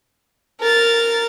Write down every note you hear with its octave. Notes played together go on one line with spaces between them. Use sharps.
A#4 A6